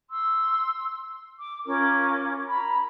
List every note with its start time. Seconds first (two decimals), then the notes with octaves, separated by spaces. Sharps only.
0.10 C6 E6
1.39 D6
1.66 C#4 F4 A#4 D6
2.49 A#5 B5